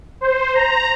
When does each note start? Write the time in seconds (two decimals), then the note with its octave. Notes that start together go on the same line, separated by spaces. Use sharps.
0.21 C5
0.54 A#5